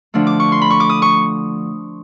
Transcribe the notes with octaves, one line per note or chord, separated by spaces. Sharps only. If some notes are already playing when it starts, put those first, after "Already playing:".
D3 F3 A3 D4
D6
C#6
C6
B5
C#6
D6
D#6
C#6